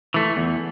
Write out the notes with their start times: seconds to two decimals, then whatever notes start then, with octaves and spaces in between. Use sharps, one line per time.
0.14 E3 A3
0.37 E2